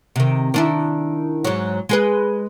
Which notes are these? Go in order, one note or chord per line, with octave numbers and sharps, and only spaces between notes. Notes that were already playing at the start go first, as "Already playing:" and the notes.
C3 D#3
D#3 D4 E4
G#2 F#3
G#3 G#4 B4